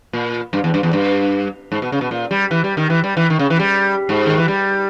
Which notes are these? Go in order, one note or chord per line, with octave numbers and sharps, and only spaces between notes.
A#2
G2
E2
G2
E2
G2
G#2
B2
C#3
B2
A#2
G3
E3
G3
D#3
E3
G3
E3
D#3
C#3
E3
G3
G#2
D#3
E3
G3